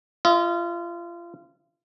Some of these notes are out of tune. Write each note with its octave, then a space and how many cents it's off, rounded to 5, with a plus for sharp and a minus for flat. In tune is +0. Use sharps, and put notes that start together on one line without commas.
F4 -30 D#5 +35